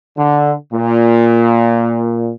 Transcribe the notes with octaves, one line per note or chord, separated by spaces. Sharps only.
D3
A#2